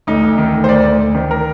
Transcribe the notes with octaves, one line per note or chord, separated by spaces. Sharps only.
D2 D#4
D2
D#3
D2
C5
D2 D5
D2
D2
D#3
A#4